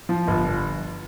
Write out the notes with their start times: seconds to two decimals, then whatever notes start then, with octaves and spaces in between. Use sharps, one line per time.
0.09 F3
0.28 G1